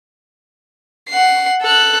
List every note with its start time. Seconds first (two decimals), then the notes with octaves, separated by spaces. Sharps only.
1.09 F#5 C7
1.62 A4 F#6